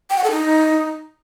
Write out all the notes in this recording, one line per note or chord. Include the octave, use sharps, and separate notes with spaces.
G5
F#5
A4
D#4